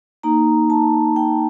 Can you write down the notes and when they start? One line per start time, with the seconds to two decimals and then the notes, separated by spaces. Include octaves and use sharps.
0.23 A#3 D#4 A#5
0.70 A5
1.16 G5